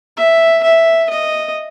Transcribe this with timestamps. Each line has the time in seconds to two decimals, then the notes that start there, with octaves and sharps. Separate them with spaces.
0.17 E5
0.63 E5
1.10 D#5